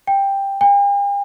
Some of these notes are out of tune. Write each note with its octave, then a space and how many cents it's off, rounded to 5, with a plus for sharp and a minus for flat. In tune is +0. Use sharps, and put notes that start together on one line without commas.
G5 +10
G5 +45